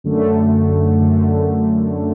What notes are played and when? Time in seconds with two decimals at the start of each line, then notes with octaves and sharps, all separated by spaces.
0.04 F#2 D3 A3
0.99 F#2 D3 A3